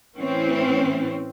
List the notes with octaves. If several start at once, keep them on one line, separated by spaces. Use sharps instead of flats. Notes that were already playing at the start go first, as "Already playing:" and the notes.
A2 E3 C4 C#4